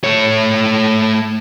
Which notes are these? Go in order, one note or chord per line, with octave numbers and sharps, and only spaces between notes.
A3 C#5